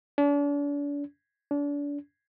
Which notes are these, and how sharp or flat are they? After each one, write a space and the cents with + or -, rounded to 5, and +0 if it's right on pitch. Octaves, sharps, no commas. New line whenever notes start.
D4 -40
D4 -35